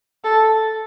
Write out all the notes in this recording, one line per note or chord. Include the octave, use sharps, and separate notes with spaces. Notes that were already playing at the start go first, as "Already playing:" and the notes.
A4